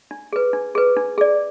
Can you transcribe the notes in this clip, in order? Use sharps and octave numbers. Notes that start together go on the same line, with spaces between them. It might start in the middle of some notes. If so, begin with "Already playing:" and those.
D4
G#4 B4
D4
G#4 B4
D4
G#4 D5